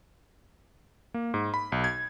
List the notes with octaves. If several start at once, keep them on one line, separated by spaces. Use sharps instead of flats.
A#3
G#2
B5
B1
G#6